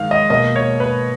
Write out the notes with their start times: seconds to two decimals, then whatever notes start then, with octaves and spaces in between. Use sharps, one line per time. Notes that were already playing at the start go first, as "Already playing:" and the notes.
Already playing: G#2 D#3 F5
0.11 D#5
0.30 B2 A#3 D#5
0.56 C#5
0.80 B4